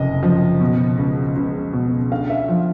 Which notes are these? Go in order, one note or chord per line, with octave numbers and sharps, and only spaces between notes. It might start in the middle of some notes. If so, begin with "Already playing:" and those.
Already playing: F#1 F2 C3 D#5
F3
B2
C#2
C#2
B2
D3 F5
E5
F5
F3